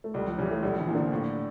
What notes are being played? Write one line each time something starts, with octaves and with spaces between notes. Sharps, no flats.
A3
C#2 G3
F3
C#3 E3 G3
A3
A#1 G3
E3
A#2 F3 A#3
D3
A2